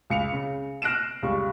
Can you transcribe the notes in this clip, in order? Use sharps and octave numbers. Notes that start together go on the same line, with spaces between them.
C#2 C#7 F7
C#3
F6 F#6 A#6 C7 D7 E7
C#2 G3 C#6